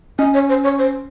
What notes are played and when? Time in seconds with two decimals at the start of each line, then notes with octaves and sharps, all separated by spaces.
0.19 C#4 D#5
0.34 C#5
0.49 C5
0.64 C#5
0.79 C5